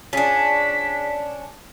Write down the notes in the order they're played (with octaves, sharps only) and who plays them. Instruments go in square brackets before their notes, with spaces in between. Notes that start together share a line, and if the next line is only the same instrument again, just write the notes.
[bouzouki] C#4 D4 [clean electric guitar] F4 G#4 [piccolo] B6